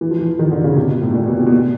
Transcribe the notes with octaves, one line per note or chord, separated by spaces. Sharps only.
E3
F3
E3
D#3
D3
C#3
C3
B2
A2
A#2
B2
C3
B2
A#2